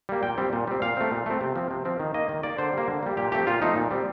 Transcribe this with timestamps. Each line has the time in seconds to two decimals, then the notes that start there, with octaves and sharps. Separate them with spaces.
0.09 G3 A#3
0.23 A#2 G5
0.38 G3 C4
0.53 A#2
0.67 G3 C4
0.82 A#2 F5
0.97 A3 C4
1.11 A#2
1.26 A3 C4
1.41 C3
1.56 F3 C4
1.71 C3
1.85 F3 C4
2.00 D#3
2.14 A#3 D#5
2.29 D#3
2.43 A#3 D5
2.58 D3 C5
2.73 G3 A#3
2.88 D3
3.03 G3 A#3
3.17 A#2 G4
3.32 F3 A3 C4 G4
3.47 A#2 F4
3.61 F3 A3 C4 D#4
3.76 A#2
3.91 G3 C4